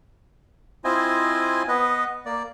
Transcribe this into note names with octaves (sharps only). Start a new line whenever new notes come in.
C4 E4 F4 C5 D#5 G#5
B3 B4 D#5
A#3 D5